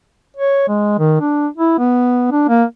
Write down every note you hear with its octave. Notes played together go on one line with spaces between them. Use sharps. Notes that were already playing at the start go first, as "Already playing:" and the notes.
C#5
G#3
D#3
D4
E4
B3
D4
A#3